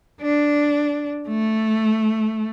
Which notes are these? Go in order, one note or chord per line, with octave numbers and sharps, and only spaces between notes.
D4
A3